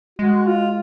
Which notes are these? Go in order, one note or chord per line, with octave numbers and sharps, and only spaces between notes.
G#3 F#4
F4